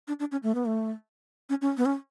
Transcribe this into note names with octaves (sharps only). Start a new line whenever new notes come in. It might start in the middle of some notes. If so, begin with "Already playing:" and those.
D4
D4
C#4
A3
B3
A3
C#4
C#4
B3
C#4